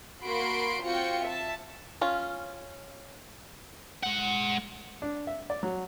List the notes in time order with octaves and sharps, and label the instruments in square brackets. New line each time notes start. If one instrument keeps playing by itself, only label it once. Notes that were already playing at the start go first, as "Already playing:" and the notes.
[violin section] A#3 F#4 B5 C6 D7
C4 F4 F#4 G5 C#7
E5 A5
[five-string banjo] C#4 F4
[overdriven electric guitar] G#3 F#5
[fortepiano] D4
E5
D5
F#3